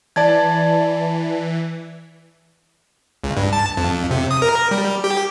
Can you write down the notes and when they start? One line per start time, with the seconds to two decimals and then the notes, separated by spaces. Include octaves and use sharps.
0.16 E3 D5 A5 G#6
3.24 C#2
3.37 G2
3.53 A5
3.77 F2
4.11 C3
4.31 D#6
4.42 A#4
4.71 G3
5.04 G4